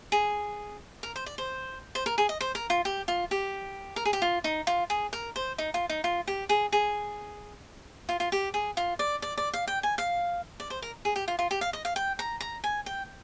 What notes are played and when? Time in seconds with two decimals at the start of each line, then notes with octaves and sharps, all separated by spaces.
0.12 G#4
1.03 A#4
1.16 C5
1.26 D5
1.38 C5
1.95 C5
2.06 A#4
2.18 G#4
2.29 D#5
2.41 C5
2.55 A#4
2.70 F4
2.85 G4
3.08 F4
3.31 G4
3.96 A#4
4.05 G#4
4.13 G4
4.22 F4
4.44 D#4
4.67 F4
4.90 G#4
5.13 A#4
5.36 C5
5.58 D#4
5.74 F4
5.89 D#4
6.04 F4
6.27 G4
6.49 G#4
6.72 G#4
8.09 F4
8.20 F4
8.32 G4
8.54 G#4
8.77 F4
8.99 D5
9.22 D5
9.38 D5
9.53 F5
9.67 G5
9.83 G#5
9.98 F5
10.60 D5
10.70 C5
10.82 A#4
11.05 G#4
11.16 G4
11.28 F4
11.39 F4
11.51 G4
11.61 F5
11.73 D#5
11.85 F5
11.96 G5
12.19 A#5
12.40 A#5
12.64 G#5
12.86 G5